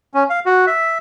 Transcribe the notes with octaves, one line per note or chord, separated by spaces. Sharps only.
C#4
F5
F#4
E5